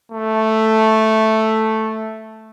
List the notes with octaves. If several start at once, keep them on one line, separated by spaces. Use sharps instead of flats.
A3